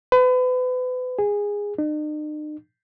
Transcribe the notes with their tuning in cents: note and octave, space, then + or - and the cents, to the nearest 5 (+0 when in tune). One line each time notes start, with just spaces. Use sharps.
B4 +35
G#4 -15
D#4 -45